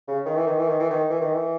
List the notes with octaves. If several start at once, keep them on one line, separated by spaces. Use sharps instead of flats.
C#3
D#3
E3
D#3
E3
D#3
E3
D#3
E3
D#3
E3